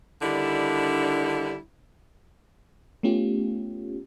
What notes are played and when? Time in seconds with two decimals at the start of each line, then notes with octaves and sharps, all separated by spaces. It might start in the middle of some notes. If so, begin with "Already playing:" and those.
0.22 D3 D#3 G3 D4 E4
3.03 A3 B3 C#4 F4 G4